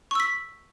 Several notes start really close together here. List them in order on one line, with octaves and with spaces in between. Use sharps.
C#6 E6 B6